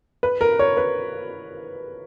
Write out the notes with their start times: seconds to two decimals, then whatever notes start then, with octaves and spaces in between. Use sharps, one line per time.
0.23 B4
0.41 A#4
0.59 C#5
0.77 B4